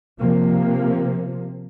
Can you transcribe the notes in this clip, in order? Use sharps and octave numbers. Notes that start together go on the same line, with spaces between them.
C3 F3 A#3